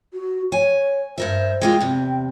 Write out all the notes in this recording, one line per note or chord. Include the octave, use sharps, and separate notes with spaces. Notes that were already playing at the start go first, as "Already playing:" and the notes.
F#4
C#5 G#5
G2 A#4 C5 E5
G#3 A#3 F4 G5
E2 C3